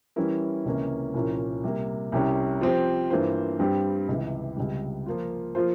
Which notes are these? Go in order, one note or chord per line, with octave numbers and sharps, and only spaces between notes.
E3 G3 C#4 E4 A#4
C#2 C3 E3 A#3 C#4
C2 A#2 F3 A#3 C#4
C3 G3 A#3
C2 C3 G3 C#4 G4
F3 C4 G4
G2 E3 A#3 F4 C5
G2 G3 C4 G4
C#2 C3 E3
C#2 C3 G3
F3 A#3 F4
F3 A#3 F4 C5